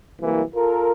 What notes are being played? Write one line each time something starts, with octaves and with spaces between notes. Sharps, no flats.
C2 E3 F#3 A#3
F4 A4 A#4